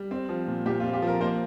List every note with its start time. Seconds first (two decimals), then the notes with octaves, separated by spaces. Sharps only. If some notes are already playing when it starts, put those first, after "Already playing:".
Already playing: G3
0.11 C4
0.29 F3
0.47 A#2
0.66 A#2 G4
0.80 F4
0.84 C4
0.93 G4
1.02 F3 A#4
1.21 A#3 C5